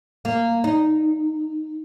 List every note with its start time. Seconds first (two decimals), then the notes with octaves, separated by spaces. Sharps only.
0.25 A#3
0.64 D#4